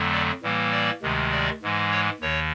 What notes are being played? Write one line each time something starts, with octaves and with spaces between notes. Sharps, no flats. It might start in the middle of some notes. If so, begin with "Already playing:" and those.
Already playing: F2 D3 F#3 A3
D5
A2 E3 G3 A#3
D5
D2 C3 D#3 G#3
D5
G#2 E3 G#3
C#5
D#2 D#3 C#5